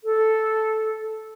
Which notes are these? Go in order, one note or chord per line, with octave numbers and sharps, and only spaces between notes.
A4